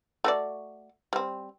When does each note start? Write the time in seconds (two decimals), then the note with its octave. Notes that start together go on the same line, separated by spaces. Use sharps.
0.24 A3 F#4 D5
1.13 G3 C4